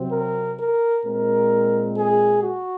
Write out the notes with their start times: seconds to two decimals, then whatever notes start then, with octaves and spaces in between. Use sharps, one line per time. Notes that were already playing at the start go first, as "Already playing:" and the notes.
Already playing: C3 F#3 C4
0.11 A#4
0.57 A#4
1.04 A#2 G#3 C4 A#4
1.96 G#4
2.42 F#4